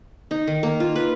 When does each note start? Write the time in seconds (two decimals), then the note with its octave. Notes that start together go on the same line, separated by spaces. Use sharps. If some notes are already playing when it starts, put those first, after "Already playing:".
0.31 D#4
0.47 D#3
0.63 A#3
0.80 F4
0.96 B4